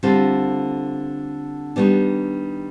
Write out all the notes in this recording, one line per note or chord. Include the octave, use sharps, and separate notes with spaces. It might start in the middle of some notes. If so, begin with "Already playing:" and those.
D3 G3 C4 F4
D#3 G3 B3 D4